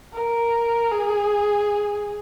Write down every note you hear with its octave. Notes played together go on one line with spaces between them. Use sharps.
A#4
G#4